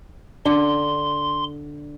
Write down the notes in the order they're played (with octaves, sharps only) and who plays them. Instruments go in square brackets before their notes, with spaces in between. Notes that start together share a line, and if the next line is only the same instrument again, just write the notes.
[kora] D3 [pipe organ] C6